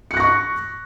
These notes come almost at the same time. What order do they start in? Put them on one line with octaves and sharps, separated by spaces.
C#7 F#6 A#6 C#6